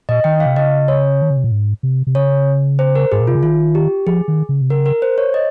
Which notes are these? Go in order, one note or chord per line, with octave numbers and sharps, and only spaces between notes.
A#2 D#5
D#3 G5
F5
C3
C#3 D#5
C#5
D#3
C#3
C3
A#2
G#2
C3
C3
C#3 C#5
C5
A#4
G#2 G#4
A#2
C3 F4
C#3
D#3 F4
G4
F3 G#4
D#3
C#3
C3
C#3 A#4
A#4
C5
C#5
D#5